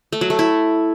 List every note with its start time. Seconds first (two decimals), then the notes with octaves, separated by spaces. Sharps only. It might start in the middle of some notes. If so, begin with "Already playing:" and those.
0.12 A3
0.21 F#3
0.30 A3
0.39 E4